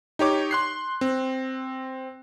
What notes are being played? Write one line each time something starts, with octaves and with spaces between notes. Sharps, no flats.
D#4 G4 C#5 D6
C6 F#6 C7
C4